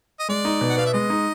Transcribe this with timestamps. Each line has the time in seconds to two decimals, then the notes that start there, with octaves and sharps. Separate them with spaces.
0.20 D#5
0.29 G#3 D5
0.45 D#4
0.61 B2
0.70 F#5
0.77 B3 F5
0.86 E5
0.93 G#3 D#5
1.10 D#4